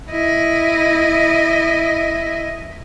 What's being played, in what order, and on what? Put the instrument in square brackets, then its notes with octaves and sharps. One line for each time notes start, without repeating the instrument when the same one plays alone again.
[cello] E4 D#5